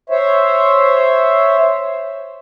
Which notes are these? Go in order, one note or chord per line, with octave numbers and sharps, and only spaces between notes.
C5 C#5 E5